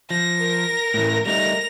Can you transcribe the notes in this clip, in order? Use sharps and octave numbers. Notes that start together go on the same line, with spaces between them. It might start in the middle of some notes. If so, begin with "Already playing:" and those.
F3 A#6
A#4
A2 E3
G3 A3 D#4 A#6 F7